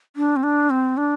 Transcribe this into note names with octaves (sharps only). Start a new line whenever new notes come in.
D4
C4
D4
C4
D4